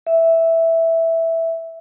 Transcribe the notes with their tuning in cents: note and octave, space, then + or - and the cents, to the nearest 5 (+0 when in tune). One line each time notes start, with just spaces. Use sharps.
E5 -5